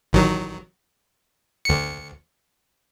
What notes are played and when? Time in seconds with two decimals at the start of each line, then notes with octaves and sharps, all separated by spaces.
0.13 A1 D#3 F#3
1.65 D2 C#7